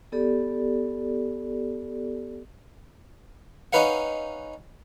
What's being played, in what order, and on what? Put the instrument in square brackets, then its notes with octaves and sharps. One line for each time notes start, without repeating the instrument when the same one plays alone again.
[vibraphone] B3 G4 A4 D5
[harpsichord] C#4 D#4 B4 F5 F#5